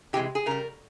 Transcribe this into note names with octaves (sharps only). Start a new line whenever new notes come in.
C3 E3 G#3 G4
G#4
C#3 G3 A#4